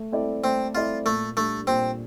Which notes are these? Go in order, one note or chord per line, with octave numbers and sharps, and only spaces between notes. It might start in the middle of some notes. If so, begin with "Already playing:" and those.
Already playing: A3
C4 E4 A4 D5
A3 C4
C4 E4 F4 A4 D5
A#2 A3
G3 A3 D4
A#2 C4